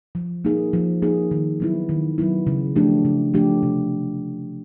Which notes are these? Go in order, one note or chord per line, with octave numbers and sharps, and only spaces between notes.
F3
A#3 D#4 G#4
F3
A#3 D#4 G#4
D#3
F#3 B3 E4
D#3
F#3 B3 E4
C#3
F3 A3 D4 G4
C#3
F3 A3 D4 G4
C3